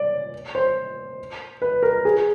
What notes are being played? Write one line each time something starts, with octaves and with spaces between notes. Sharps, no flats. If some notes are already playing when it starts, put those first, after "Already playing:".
Already playing: D5
C5
B4
A#4
G#4